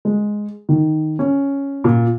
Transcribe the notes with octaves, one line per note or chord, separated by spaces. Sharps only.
G#3
D#3
C#4
A#2